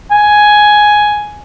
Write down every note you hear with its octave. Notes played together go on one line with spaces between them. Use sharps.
G#5